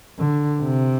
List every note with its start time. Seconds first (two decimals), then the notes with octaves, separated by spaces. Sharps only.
0.19 D3
0.62 C3